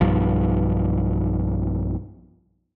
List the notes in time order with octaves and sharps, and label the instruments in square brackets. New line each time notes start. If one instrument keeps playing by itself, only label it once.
[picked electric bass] B1 G2 F3